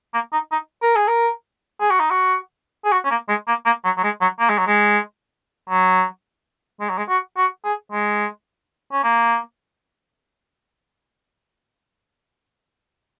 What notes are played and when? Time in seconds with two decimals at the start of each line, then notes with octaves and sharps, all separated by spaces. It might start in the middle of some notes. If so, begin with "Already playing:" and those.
0.14 A#3
0.32 D#4
0.52 D#4
0.82 A#4
0.96 G#4
1.07 A#4
1.81 G#4
1.90 F#4
2.00 D#4
2.10 F#4
2.85 G#4
2.92 F#4
3.04 C#4
3.10 A#3
3.28 G#3
3.47 A#3
3.65 A#3
3.84 F#3
3.97 F#3
4.03 G#3
4.21 F#3
4.39 A#3
4.49 G#3
4.58 F#3
4.67 G#3
5.69 F#3
6.80 G#3
6.89 F#3
6.97 G#3
7.09 F#4
7.37 F#4
7.64 G#4
7.92 G#3
8.92 C#4
9.03 A#3